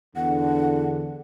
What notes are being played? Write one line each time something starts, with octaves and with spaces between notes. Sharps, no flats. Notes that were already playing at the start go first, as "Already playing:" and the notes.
E2 D3 F#5